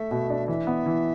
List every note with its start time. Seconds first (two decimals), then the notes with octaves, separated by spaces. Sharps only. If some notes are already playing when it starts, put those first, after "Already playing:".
Already playing: A3 A4 E5
0.11 B2
0.30 D4
0.48 E3 E5
0.67 B3
0.86 E3